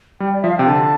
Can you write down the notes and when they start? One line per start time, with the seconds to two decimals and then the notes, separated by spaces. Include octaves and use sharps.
0.20 G3 G5
0.33 D5
0.42 F3 E5
0.50 F5
0.58 C3 G5
0.66 D3 A5